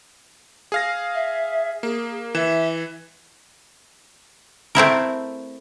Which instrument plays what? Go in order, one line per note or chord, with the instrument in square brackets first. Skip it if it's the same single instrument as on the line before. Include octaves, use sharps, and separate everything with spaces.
[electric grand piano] G#4 F5 A#6
[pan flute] E5
[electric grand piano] A#3 [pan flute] G#4
[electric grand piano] E3 E7 [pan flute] E5
[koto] A3 C4 E4 A#4